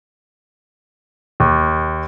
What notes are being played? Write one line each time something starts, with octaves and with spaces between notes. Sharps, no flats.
D#2